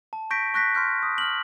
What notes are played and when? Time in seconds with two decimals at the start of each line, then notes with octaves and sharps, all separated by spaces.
0.13 A5
0.31 C#6 G6 A#6 B6 D7
0.54 C#6 F#6 A#6 B6
0.75 C6 F6 G6
1.03 D#6
1.18 F6 F#7